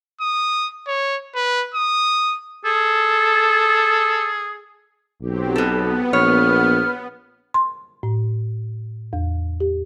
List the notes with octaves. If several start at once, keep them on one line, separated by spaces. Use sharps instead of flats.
D#6
C#5
B4
D#6
G#4 A4
B1 F#3 C4 G4
B2 B3 A4
A#1 C#5 F6
C6
A2
E2
G4